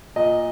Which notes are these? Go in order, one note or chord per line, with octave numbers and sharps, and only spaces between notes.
A#2 D#5